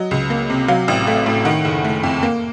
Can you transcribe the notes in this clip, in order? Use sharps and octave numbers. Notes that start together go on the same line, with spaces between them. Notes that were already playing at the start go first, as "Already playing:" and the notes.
Already playing: F#3 D#5
C#2
A#3
C3
F#3 F5
A1
A3
A2
D#3 F#5
F#1
A3
F2
A#3